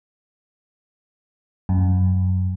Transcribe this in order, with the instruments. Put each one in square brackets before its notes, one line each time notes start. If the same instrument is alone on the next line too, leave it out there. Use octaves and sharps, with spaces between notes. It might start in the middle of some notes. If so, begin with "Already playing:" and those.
[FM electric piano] F#2